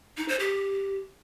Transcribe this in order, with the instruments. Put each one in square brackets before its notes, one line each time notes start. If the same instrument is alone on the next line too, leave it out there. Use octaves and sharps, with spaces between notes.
[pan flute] D#4
C5
G4